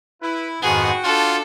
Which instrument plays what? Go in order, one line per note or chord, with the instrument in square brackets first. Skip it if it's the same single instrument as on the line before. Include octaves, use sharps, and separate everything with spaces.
[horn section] E4 [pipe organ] B4
[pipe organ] F2 G#2 D#3 [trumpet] B3 [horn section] F#4 G5 [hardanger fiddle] G#4
[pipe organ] D4 [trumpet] F4 [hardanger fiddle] A4